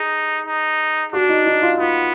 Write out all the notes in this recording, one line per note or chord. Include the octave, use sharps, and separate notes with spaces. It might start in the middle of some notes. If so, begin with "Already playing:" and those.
Already playing: D#4 G#4
D#4
D4 F#4
D#4
D#4
F4
B3 F4